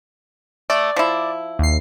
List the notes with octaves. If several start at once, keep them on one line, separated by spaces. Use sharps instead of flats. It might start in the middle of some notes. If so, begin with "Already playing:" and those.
A3 D5
F3 E4
D#2 C7